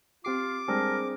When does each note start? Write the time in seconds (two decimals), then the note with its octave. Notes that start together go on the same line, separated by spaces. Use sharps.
0.25 C4 F4 G4 D6 C7
0.68 G3 G#3 C4 D4 G#4 A#4 A5